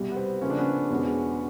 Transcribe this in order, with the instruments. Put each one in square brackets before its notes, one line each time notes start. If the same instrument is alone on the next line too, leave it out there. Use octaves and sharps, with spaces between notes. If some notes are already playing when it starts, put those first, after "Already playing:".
Already playing: [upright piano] C2 B2 G3
[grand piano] B3
C4
[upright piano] C#3 F3 A#3 [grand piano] C#4
[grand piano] D4
B3 C#4
[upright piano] E2 B2 G#3 C#4 F#4